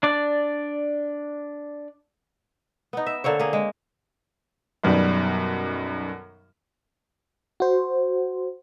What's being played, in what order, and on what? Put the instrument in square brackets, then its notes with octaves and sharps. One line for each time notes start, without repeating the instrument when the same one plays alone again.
[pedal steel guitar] D4 D5
[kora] B3 D#4
E5
D3 A#3 C4 C#5
A#3 G#4
G#3
[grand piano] B1 F#2 D#3 G3 B3
[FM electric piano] F#4 C5